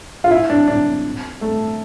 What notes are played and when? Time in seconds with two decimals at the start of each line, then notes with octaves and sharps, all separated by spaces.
0.24 F4
0.31 E4
0.50 D4
0.68 D4
1.41 A3